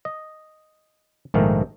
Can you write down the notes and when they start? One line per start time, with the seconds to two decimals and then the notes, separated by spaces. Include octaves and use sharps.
0.05 D#5
1.34 A#1 G#2 D#3 A3 A#4